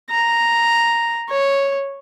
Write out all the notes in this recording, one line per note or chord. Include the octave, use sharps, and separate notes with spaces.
A#5
C#5